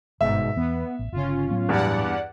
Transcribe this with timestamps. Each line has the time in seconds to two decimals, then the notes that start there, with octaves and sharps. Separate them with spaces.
0.21 G1 G#2 B2 E5
0.56 E2 B3
0.99 A1
1.12 G1 C#3 C#4 F4
1.51 A2 F#3 B3
1.69 E2 G2 D5 F#5